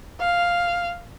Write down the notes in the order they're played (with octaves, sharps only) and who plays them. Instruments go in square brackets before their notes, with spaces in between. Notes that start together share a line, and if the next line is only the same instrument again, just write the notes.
[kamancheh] F5